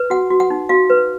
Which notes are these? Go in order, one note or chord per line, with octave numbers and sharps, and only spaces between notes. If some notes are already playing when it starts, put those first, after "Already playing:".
Already playing: B4
F#4 F#5
F#4
F#5
D#4
F#4 F5
B4